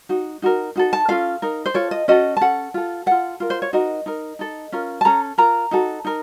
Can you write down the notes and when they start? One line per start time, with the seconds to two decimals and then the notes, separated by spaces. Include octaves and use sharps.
0.09 D#4 F#4
0.42 D#4 F#4 A#4
0.76 D#4 F#4 A4
0.93 A5
1.08 C#4 F4 A4 F5
1.42 D#4 A#4
1.66 C5
1.74 F4 A4 C#5
1.91 D#5
2.08 C#4 F#4 A4 D#5
2.37 A5
2.41 C#4 A4 F#5
2.74 F4 A4
3.06 F4 A4 F#5
3.40 F4 A#4
3.50 C5
3.62 C#5
3.73 D#4 F#4 A#4 D#5
4.06 D#4 A#4
4.39 D#4 A4
4.72 C#4 F4 A#4
5.01 A5
5.05 C#4 A4 A#5
5.38 F4 A#4 A#5
5.71 D#4 F#4 A4
6.05 D#4 A#4